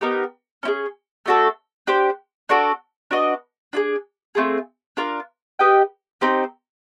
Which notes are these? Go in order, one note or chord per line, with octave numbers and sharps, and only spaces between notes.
B3 D#4 G4 A#4
C#4 E4 G#4
A3 D4 F#4 A4
D4 G4 C5
D4 F#4 A4 D5
D4 F#4 B4 D#5
D4 F4 G#4
A3 C4 F4 G#4
D4 F4 A#4
G4 B4 D#5 G5
C4 D#4 G4 C5